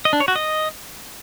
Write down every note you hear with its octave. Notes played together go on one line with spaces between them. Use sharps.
D#5
D4
C#5
F#4
D#5